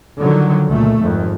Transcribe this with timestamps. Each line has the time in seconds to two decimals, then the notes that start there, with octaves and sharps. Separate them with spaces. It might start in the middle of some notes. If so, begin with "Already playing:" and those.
0.19 D3 D#3 F3 F#3
0.69 C#2 A#2 A3
0.99 G#1 F2